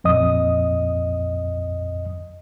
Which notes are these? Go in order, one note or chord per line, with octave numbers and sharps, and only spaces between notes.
A#1 F2 D#5 D#6